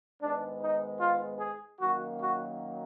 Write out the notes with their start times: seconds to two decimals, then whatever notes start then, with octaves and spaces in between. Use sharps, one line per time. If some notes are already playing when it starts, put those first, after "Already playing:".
0.21 G#2 D#3 G#3 B3 D4
0.61 D#4
1.00 F4
1.39 G#4
1.79 F#2 D#3 F#3 A#3 F#4
2.19 F#4